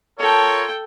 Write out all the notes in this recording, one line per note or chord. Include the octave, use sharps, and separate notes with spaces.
F4 A4 A#4 C#5 G5 A5